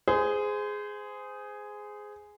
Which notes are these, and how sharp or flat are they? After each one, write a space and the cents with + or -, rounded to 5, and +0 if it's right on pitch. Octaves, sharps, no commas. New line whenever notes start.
G#4 +0 C5 -30